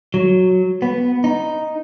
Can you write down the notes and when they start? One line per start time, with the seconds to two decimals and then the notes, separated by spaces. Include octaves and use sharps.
0.14 F#3
0.82 B3
1.24 D#4